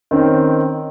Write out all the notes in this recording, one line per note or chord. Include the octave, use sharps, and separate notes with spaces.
D#3 C4 C#4 D#4